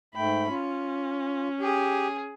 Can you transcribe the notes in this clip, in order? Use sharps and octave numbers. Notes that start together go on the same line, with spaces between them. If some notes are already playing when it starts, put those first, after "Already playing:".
G#2 A3 G5 B5
C#4 F4
G4 G#4